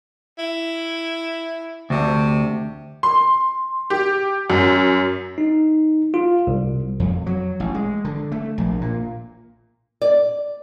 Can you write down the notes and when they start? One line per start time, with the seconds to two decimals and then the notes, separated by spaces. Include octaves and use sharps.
0.38 E4
1.90 D2 C3
3.03 C6
3.90 G4
4.50 F#2
5.38 D#4
6.14 F4
6.47 C2
7.00 F2
7.26 F#3
7.60 A1
7.74 G#3
8.05 D3
8.32 A3
8.58 A#1
8.81 A#2
10.02 D5